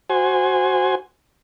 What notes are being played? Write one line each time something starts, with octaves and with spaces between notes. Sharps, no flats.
F#4 C5 G#5